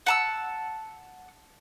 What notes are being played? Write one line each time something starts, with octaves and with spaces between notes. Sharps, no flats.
F#5 A5 E6